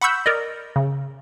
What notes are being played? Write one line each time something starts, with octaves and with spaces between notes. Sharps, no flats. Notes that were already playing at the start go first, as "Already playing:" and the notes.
F#5 B5 C#6 E6 G6
A#4 D5 D#5
C#3